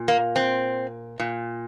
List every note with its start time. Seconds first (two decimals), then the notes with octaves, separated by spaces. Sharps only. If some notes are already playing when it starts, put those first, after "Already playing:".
Already playing: A#2
0.08 A#3
0.36 C4
1.19 A#2